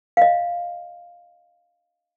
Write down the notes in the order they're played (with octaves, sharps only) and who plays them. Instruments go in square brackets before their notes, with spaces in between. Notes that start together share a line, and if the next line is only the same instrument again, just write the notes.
[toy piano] D#5 F5